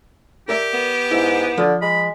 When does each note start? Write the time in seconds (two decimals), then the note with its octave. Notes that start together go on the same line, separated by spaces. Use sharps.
0.49 G4 A#4 D5 E5
0.74 B3
1.11 G#2 E4
1.57 D3 F3
1.82 G#3 B5